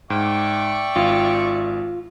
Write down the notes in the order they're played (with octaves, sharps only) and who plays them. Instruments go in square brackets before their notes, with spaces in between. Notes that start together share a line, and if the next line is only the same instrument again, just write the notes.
[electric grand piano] G#2 [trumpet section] D5 E5 C#6 [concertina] G5
[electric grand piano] G#1 [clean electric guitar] F4